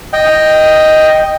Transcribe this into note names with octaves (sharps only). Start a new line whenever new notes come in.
D#5 G5